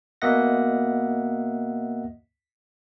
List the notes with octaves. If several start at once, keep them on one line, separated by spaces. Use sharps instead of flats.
B2 A#3 D#5 E5 F#5 A#6